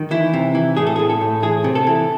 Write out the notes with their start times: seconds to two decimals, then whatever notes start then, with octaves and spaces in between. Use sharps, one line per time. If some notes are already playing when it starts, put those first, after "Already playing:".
Already playing: D#3
0.11 E3 E4
0.33 C3
0.55 E3
0.77 A2 G#4
0.87 A4
0.96 A2 G#4
1.10 A4
1.21 A2
1.43 E3 G#4
1.64 C3
1.75 A4
1.87 E3